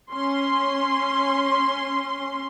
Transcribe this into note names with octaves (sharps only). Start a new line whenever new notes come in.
C#4 C6